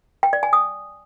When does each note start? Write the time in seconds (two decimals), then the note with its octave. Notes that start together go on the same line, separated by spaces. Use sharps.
0.23 G5
0.33 D5
0.43 G#5
0.53 D#6